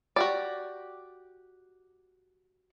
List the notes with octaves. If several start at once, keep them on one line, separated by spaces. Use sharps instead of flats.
F#4 G4 D5